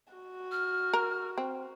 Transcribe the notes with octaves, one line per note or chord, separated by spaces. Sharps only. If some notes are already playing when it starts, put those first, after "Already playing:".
F#4
F6
A#4
C4